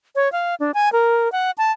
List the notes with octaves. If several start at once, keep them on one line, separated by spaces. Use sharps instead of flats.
C#5
F5
D4
G#5
A#4
F#5
A5